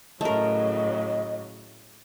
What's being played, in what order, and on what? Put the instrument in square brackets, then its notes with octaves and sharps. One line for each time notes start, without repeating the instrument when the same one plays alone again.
[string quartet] A2 C#3 F#3 [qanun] A3 A#4 [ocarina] D#5